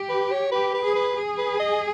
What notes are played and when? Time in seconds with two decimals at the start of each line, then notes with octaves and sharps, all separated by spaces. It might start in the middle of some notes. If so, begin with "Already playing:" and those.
Already playing: G4
0.09 B4
0.32 C#5
0.52 G4 B4
0.74 B4
0.85 G#4
0.95 B4
1.17 G#4
1.38 B4
1.60 D#5